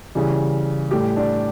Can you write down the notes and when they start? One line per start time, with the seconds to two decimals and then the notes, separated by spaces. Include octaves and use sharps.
0.15 C#3 E3 G3
0.91 A2 G3 G4
1.16 D4